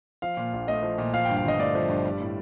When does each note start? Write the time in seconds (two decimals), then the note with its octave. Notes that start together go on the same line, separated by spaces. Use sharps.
0.22 F3 F5
0.37 A#2
0.53 A#1
0.68 A3 D#5
0.83 F3
0.98 A#2
1.13 F3 F5
1.25 G2 G5
1.37 F5
1.45 G1 D#5
1.59 A3 D5
1.75 F3
1.89 G2
2.05 G3
2.21 A2